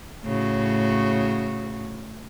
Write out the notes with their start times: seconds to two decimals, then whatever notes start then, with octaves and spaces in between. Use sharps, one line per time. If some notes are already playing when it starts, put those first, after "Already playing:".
0.23 A2 C#3 F#4